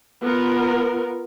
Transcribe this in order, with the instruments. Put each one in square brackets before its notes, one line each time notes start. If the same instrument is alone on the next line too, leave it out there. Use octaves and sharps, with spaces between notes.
[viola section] B3 F4 A#4